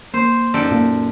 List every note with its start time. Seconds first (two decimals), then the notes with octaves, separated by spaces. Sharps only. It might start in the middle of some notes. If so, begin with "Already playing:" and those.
0.14 A#3 C5
0.54 F#2 D#4 A4 D5 G5
0.71 A#2 A#3 F4